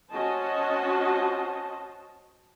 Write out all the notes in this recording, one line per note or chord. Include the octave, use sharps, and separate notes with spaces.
C#4 F#4 C5 D#5 A5